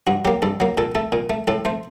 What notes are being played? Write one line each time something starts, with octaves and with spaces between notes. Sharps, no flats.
G2 F#4
F#3 A#3 G4
G2 A4
F#3 A#3
A#2 A4
A3 A4
A#2
A3
A2 A4
A3 C5